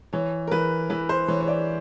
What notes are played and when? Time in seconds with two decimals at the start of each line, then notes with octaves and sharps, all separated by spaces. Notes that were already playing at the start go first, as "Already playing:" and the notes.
0.13 E3 C#5
0.48 A#4
0.51 E3 B4
0.90 E3 B4
1.09 C5
1.28 E3 C#5
1.41 C#5
1.48 D5